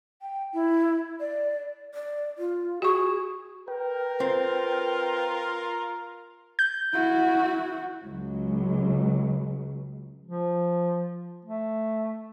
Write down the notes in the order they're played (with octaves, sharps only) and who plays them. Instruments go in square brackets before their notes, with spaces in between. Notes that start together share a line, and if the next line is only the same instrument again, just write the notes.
[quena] G5
E4
D5
[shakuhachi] D5
F4
[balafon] F#4 C#6 [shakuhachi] G#4
[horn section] A#4 [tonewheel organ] B4 G5
[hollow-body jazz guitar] C4 [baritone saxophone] F4
[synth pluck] G6
[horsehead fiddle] E4 F#4
[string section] C#2 F#3
[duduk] F3
A3